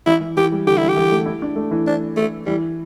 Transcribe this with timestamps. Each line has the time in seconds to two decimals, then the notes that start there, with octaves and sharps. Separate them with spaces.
0.06 E3 E4
0.21 E3
0.37 E3 G4
0.52 G3
0.67 D3 G4
0.77 E3 E4
0.89 G4
0.97 E3
1.11 A3
1.26 E4
1.42 D4
1.56 A3
1.71 E3
1.87 D4
2.17 A3
2.46 E3 G3